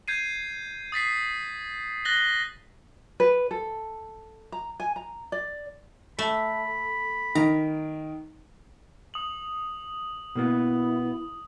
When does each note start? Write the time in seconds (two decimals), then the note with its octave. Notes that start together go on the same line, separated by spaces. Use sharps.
0.08 G6 G#6 C7 D#7
0.92 D#6 A6 B6 C7
2.05 F#6 A6 A#6 F#7 G7
3.20 B4
3.51 A4
4.52 A#5
4.80 G#5
4.96 A#5
5.32 D5
6.19 A3 B5
7.35 D#3 A#5
9.14 D#6 F#7
10.35 B2 A#3 B3 E4